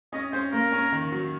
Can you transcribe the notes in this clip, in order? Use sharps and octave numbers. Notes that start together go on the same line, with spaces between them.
C#4 D#5
C#4 C5
A#3 A#4
C#4
D#3
F#3